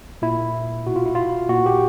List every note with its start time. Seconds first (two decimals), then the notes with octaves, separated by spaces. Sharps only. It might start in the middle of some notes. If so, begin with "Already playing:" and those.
0.22 A#2 E4
0.87 B2 F#4
0.96 F4
1.06 E4
1.15 F4
1.49 A#2 F#4
1.66 G4